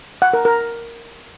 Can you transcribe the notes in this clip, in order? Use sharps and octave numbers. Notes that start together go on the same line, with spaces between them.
F#5
A#4
A#4